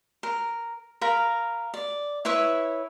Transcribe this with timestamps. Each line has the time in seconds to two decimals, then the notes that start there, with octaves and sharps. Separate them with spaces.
0.23 A#4
1.01 A#4 F5 B5
1.74 D5
2.25 E4 B4 C#5 E5